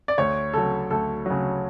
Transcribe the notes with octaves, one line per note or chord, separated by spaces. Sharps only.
D5
D2 C#5
C#3 F#3 A4
D2 A4
C#3 F#3